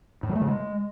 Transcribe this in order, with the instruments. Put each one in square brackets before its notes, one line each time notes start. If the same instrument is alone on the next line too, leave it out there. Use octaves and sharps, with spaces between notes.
[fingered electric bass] A2
F#3
A3
C#3
G#3